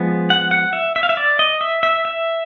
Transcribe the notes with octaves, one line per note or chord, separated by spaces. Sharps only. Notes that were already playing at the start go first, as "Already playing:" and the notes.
Already playing: F3 G#3 B3
F#5
F#5
E5
E5
F5
E5
D5
D#5
E5
E5
E5